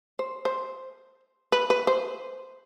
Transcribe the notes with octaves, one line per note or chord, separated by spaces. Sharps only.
C5
C5
B4
B4
C5